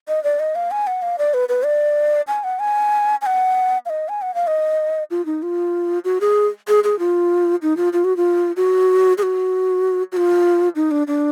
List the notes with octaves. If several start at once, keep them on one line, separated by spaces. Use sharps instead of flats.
D#5
D5
D#5
F5
G#5
F#5
F5
D5
B4
B4
D5
G#5
F#5
G#5
G#5
F#5
F5
D#5
G#5
F#5
F5
D#5
F4
D#4
F4
F#4
G#4
G#4
G#4
F4
D#4
F4
F4
F#4
F4
F#4
G#4
F#4
F#4
F4
D#4
D4
D4